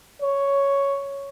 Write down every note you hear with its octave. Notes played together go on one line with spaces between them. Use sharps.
C#5